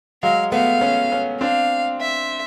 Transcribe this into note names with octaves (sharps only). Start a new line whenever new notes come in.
F#3 G#3 F5
A3 B3 F5
B3 C#4
B3 C#4
C4 D4 F5
E5